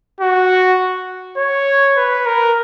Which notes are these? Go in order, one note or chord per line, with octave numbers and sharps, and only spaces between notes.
F#4
C#5
B4
A#4